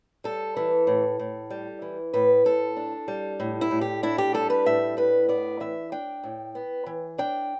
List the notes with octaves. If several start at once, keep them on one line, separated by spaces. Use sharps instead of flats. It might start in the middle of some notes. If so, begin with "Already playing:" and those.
G3 A4
E3
A2
A2
G3
E3
A2 B4
A2 A4
D4
G3
A2
E4
A2
G4
D4 E4
G4
G3 A4
B4
A2 E5
A2 B4
B3 D5
E3 E5
D4 G5
A2
B3
E3
D4 G5